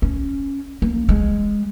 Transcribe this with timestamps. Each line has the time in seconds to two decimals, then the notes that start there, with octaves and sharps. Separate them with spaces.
0.02 C#4
0.82 A#3
1.09 G#3